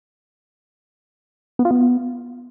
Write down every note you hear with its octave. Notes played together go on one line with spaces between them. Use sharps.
B3
F4
B3